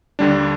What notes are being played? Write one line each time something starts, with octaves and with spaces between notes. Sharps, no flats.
D#2 D3 G3 D4